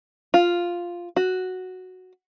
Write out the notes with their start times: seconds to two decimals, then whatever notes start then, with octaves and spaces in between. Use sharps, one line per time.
0.34 F4
1.16 F#4